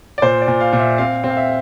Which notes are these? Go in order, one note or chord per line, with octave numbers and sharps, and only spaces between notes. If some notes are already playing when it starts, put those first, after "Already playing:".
D5
A#2 C5
D5
A#2
F5
A#2
E5
C4 F5
C4
F5
E5